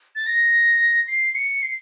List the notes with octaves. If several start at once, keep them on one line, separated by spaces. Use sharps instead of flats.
A6
A#6
C7
C#7
C7